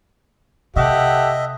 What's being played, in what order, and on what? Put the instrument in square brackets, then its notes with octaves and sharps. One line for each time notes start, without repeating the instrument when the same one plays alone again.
[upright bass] C3 [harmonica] G4 A4 F#5 [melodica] D#5 E5